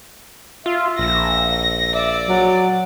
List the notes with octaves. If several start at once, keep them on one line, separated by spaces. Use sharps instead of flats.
F4 E5
A#1 A#6
D5 E5
F#3